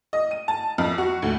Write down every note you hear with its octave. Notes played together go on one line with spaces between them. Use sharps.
D#5
D#7
A5
F2
F#4
D2